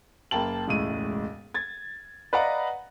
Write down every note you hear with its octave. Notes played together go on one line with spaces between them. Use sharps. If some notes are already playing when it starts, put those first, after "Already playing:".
F#1 A#3 G5 A5 F#7
E1 C#2 A2 D#7
G#6 A6
B4 D5 D#5 F5 F#5 A#5